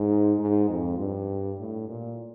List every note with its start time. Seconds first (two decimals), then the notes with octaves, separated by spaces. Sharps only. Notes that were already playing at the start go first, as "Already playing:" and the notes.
Already playing: G#2
0.39 G#2
0.69 F2
0.99 G2
1.59 A2
1.89 A#2